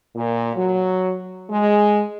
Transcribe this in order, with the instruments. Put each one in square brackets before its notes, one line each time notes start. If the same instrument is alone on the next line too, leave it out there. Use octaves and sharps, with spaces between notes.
[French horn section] A#2
F#3
G#3